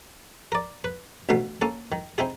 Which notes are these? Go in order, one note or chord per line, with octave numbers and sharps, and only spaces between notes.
A#4 D5
B4
A1 D2 B2 A3 F5
A#3 C#4 A4
D#3
C4 D#4 E4 G#4